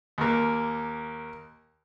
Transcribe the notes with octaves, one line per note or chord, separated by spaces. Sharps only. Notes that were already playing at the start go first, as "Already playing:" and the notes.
D#2 A#3